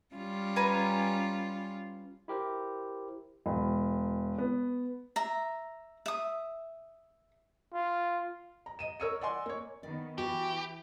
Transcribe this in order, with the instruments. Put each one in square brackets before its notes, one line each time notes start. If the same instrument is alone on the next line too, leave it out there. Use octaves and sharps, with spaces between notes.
[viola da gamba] G3 C#4 F4
[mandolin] B4 G#5 A#5
[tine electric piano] E4 G4 A#4 C5
[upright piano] E1
B3
[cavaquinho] E5 A#5
E5 D#6
[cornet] F4
[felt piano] A#5
D#5 D#7 E7
A#4 C#5 E6 C#7 D#7
D5 D#5 F#5 G#5 C6
A#3 C#5
[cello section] D#3 B3 [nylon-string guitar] D5
[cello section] E3 [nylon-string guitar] F#4 G#5 [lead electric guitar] G4